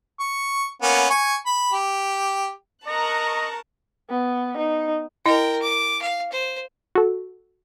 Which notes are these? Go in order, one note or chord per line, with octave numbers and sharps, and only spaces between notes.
C#6
A#3 B3 C#4
G#5 C#6
B5
G4
A#4 D#5 A5 A#5 C#6 F#6
B3
D#4
E4 A#4 D#5 G5
D6
F5
C5
F#4 A4